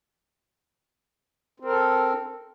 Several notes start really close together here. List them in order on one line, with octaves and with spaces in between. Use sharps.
C4 A#4 A4